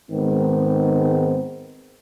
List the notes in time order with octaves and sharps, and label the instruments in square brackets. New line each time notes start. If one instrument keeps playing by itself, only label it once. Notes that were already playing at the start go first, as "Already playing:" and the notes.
[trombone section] G#2 D#3 G#3 B3 C4